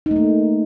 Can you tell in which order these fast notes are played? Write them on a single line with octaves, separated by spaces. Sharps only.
D#4 A3 A#3